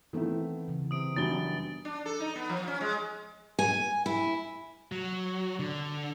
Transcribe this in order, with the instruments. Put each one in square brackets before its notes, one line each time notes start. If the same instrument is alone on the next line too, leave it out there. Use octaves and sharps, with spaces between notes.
[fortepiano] D#3 A3 E4 [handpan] E3 B3 C4
[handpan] C#3 E3
[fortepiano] C3 [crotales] D#6 D7
[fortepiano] F#2 D#3 G3 [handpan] E3 B3 D4 [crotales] A6 G7
[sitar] D4
A4
D#4
B3
F3
C#4
G#3
[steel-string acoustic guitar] G#5
E4
[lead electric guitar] F#3
D3